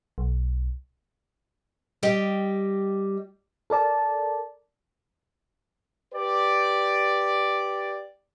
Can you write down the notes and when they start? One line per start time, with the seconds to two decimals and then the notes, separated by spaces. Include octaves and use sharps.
0.18 B1
2.03 G3 G4 D#5 G5
3.70 A4 A#4 D5 A5
6.14 G4 B4 D5